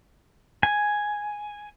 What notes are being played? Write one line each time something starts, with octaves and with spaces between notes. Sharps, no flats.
G#5